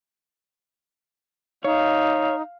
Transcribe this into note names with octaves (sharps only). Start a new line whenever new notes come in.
D#4 C#5 F5